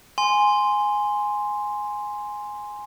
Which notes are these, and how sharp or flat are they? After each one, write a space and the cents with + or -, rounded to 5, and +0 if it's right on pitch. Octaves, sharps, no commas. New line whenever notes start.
G#5 +0 C6 +0